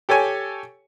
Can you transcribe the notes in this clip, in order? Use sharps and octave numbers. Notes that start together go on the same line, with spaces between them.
G4 A4 C#5 G#5